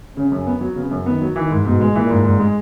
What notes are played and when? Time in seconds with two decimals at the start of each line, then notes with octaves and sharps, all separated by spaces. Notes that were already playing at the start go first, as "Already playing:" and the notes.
0.16 C#3 C#4
0.32 F#2
0.47 B3
0.61 F#3
0.76 C#3 B3
0.91 F#2
1.06 D#3 B3
1.21 F#3
1.36 D#3 E3
1.51 G#2
1.65 G#2 B2
1.81 G#3
1.95 A#2 E3
2.10 G#2
2.25 G#2
2.40 G#3